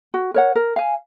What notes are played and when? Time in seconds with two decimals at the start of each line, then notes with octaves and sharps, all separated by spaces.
0.14 F#4
0.34 A#4 C#5 F#5
0.55 A#4
0.76 F5 G#5